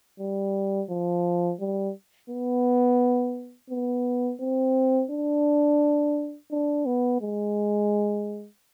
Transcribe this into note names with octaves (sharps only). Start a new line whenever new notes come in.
G3
F3
G3
B3
B3
C4
D4
D4
B3
G#3